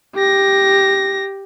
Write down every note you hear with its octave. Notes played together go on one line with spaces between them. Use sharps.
G4 A#6